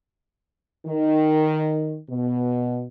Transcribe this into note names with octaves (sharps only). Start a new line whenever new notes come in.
D#3
B2